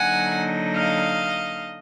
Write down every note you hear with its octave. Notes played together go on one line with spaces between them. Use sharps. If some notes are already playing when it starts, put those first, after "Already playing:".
Already playing: D3 F#3 A#3 D#4 F#5 G#5
D#5 F5